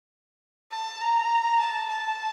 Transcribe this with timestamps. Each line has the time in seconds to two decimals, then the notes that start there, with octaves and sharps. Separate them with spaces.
0.71 A5
1.01 A#5
1.59 A5
1.88 A5